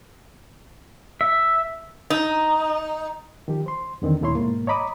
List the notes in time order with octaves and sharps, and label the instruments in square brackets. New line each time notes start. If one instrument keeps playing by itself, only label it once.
[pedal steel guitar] E5
[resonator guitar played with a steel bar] D#4
[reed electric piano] D#3 F3 G4
C5 C6
E2 D3 D#3 C4
D#2 A#2 A3 E4 C#5 C6
G#2 B2 A#3
C#5 D#5 A#5 B5 D6 D#6